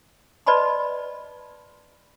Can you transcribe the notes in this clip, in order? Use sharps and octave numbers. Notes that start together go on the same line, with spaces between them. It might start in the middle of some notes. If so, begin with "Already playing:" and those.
B4 D5 D#5 A5 B5 C6